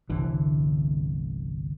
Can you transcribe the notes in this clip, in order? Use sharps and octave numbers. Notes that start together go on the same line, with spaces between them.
G1 C2 D3 E3